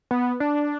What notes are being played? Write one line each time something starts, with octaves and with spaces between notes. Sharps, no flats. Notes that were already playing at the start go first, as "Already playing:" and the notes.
B3
D4